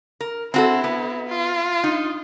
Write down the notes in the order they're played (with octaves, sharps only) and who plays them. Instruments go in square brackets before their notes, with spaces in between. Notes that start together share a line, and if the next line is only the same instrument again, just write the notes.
[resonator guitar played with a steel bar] A#4
[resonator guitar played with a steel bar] C4 F#4 A4 [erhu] E4
[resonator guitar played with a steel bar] B3
[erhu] F4
[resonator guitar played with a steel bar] D#4